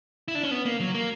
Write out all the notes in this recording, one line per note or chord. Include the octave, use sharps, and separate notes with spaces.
E4
D4
C#4
B3
A#3
F#3
A#3